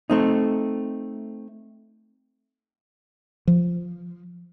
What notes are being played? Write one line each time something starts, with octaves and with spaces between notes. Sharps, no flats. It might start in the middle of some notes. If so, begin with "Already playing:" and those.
A3 C4 D#4
F3